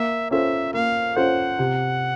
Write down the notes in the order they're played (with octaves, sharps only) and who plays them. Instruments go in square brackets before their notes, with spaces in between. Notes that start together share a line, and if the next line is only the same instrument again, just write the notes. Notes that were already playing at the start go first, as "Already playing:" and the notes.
Already playing: [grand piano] A#3 [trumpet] E5
[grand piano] C#4 F4 A4 C5 [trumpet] E5
[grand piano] A#3 [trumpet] F5
[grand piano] C#4 F4 A4 C5 [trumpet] F#5
[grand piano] C3